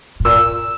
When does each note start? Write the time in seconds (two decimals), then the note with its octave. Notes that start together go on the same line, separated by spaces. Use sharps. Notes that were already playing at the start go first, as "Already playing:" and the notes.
0.20 A2
0.25 A#2 E6